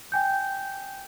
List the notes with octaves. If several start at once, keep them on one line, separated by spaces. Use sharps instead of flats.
G5 G#5 G6